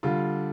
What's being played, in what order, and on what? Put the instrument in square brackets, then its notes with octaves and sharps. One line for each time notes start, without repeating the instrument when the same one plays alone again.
[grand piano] D3 G3 F4